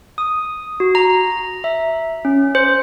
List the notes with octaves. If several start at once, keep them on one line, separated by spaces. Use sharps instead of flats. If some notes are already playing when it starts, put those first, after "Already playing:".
D#6
F#4
A#5
E5
C#4
C5